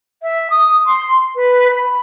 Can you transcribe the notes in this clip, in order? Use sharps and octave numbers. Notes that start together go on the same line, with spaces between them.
E5
D#6
C6
B4
B5